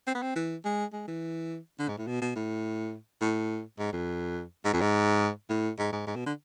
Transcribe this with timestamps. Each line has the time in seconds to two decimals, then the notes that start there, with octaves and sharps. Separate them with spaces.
0.07 C4
0.14 B3
0.22 C4
0.36 E3
0.65 G#3
0.93 G#3
1.07 E3
1.79 D3
1.88 G#2
1.98 A2
2.07 B2
2.21 B2
2.36 A2
3.21 A2
3.79 G#2
3.93 F2
4.65 G#2
4.73 F2
4.81 G#2
5.49 A2
5.78 G#2
5.92 G#2
6.07 G#2
6.16 B2
6.26 D3